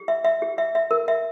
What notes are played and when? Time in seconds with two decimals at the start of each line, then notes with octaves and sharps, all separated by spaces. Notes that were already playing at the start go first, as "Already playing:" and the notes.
Already playing: G4
0.08 E5
0.25 E5
0.42 G4
0.58 E5
0.75 E5
0.91 A#4
1.08 E5